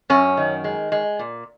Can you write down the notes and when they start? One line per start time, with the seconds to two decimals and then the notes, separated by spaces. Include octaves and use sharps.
0.10 F#2 C#4
0.37 D#3
0.64 G#3
0.92 G#3
1.19 A#2